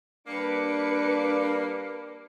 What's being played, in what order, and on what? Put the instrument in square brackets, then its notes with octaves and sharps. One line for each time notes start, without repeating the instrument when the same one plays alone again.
[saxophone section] G3 A#3 [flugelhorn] D4 [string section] B4 D6 C#7